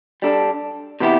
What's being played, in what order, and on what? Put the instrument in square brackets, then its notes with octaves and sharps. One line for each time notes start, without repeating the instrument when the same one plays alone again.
[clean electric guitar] G3 D4 A4
C3 E3 B3 E4 G4